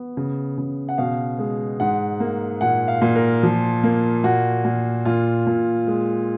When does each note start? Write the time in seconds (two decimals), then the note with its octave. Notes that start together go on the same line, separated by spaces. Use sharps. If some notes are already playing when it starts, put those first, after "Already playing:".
Already playing: B3
0.17 C#3
0.58 C#3
0.89 F#5
0.98 B2 F5
1.39 G#3
1.80 G#2 F#5
2.20 A#3
2.61 A#2 F#5
2.88 F5
3.02 A#2
3.15 A#4
3.43 F3
3.84 A#3
4.24 A#2 F#4
4.64 A#2
5.05 A#2 F4
5.47 A#2
5.87 G#3